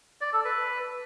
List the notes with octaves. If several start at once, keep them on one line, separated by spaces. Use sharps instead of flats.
D5
A4
B4